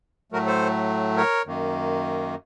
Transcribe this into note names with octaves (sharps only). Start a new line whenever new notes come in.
A2 F#3 A3 F#4 A#4
A4 C5
A#4 C#5
F#2 D#3 A#3